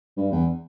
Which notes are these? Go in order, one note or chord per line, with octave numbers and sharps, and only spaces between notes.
G2
E2